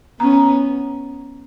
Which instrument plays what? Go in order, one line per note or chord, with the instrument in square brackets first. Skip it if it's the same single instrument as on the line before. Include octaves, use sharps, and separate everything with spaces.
[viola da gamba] B3 C#4 [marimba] A#5